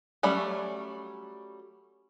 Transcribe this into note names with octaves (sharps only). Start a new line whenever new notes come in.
F#3 G3 A3 C#4 B5